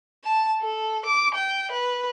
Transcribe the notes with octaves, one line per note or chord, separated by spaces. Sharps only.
A5
A4
D6
G5
B4